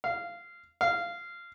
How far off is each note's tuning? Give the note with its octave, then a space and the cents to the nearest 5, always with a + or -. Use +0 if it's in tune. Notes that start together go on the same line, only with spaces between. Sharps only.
F5 -15
F5 -15